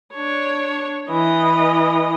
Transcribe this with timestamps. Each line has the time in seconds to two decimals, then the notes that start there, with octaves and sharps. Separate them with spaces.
0.14 D4 C#5
1.10 E3 D#5